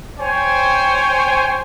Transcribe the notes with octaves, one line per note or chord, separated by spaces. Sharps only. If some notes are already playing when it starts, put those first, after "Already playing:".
C5 C#5 G5 G#5